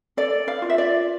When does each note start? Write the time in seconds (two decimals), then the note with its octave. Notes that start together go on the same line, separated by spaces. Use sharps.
0.17 A4 D5
0.48 F5
0.62 F4
0.70 E5
0.78 D5